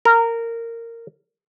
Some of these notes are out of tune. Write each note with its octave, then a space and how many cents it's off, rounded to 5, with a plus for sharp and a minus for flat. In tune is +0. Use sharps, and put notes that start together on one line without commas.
A#4 -15